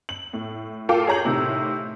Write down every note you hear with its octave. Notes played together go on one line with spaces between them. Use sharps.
F#7
A2
F4 A4 A#4 F5 G5 D6
G#4 C#5 A#5 G6 F#7
A2 C3 D#3